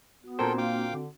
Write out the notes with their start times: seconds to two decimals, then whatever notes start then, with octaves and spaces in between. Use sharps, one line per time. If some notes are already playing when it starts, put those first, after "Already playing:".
0.24 B3 F#4 D#6
0.39 A#2 C4 D4 F#4 A4 A#4 C5 G5
0.58 A#3 F5 G5 D6
0.93 D3